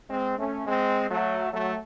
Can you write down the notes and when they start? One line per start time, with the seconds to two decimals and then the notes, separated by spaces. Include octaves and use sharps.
0.10 G#3 C4
0.38 A3 C#4
0.66 G#3 C4
1.09 F#3 A3
1.51 F#3 A3